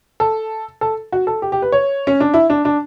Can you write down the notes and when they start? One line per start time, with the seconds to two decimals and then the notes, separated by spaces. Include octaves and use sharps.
0.20 A4
0.81 A4
1.12 F#4
1.27 A4
1.42 G4
1.52 G4
1.62 B4
1.72 C#5
2.07 C#4
2.20 D4
2.34 E4
2.50 D4
2.65 D4